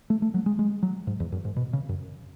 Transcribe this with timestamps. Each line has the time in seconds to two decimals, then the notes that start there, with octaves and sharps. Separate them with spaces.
0.10 A3
0.22 A3
0.34 F#3
0.46 G#3
0.59 G#3
0.83 F#3
1.07 G#2
1.20 E2
1.32 F#2
1.45 G#2
1.56 B2
1.73 C#3
1.89 F#2